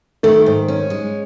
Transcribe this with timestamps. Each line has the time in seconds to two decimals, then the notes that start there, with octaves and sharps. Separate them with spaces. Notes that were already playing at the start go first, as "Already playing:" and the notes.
0.23 D#3 A3
0.46 G#2
0.68 C#4
0.90 G#3